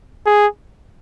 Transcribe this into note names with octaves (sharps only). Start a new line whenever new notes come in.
G#4